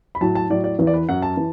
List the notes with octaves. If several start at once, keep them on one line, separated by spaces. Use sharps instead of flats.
B5
A2 F#3 A5
A5
A2 F#3 D5
D5
E2 E3
D5
B4
F#2 F#3 F#5
A5
E3